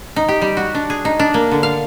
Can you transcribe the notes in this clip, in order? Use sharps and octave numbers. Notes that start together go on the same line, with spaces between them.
D#4
G4
G3
F#4
D4
G#4
D#4
D4
A#3
D3
F5